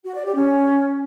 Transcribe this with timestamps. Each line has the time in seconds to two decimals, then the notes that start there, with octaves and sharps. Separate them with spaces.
0.05 F#4
0.15 D5
0.25 G4
0.35 C#4